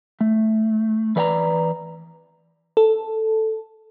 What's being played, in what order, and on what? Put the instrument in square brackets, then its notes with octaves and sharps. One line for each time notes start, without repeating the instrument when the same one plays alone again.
[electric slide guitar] A3
E3 B4 D5 G#5 A#5
[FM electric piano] A4